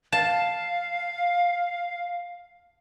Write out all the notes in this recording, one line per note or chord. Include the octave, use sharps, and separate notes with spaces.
F5 A5